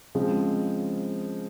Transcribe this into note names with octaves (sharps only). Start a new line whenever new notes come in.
C#3 F3 G#3 C4